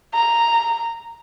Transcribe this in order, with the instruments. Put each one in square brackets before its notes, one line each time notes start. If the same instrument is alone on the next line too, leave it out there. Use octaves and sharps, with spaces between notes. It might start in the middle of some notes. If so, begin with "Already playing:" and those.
[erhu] A#5